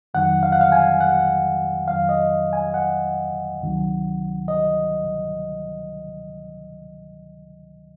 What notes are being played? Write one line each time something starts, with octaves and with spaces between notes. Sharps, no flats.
F2 D#3 F#3 F#5
F5
F#5
F5
G#5
F#5
F2 D#3 F#3 F5
D#5
G#5
F#5
C#2 C3 D#3 F#3
D#5